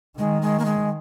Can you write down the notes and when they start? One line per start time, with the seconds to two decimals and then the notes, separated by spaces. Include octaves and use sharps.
0.19 D#3 G#3
0.42 G#3
0.59 A#3
0.65 G#3